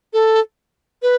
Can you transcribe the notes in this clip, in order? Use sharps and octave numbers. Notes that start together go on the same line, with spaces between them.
A4
B4